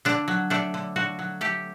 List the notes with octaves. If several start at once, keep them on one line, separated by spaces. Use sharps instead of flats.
D3 D4
F#3
A3 D4
D3
D3 F#4
F#3
A3 G4